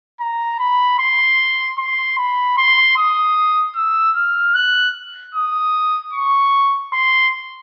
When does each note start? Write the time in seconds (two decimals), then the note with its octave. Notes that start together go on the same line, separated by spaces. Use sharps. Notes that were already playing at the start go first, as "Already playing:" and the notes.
0.20 A#5
0.59 B5
0.99 C6
1.78 C6
2.18 B5
2.57 C6
2.97 D#6
3.76 E6
4.16 F6
4.55 F#6
5.35 D#6
6.13 C#6
6.93 C6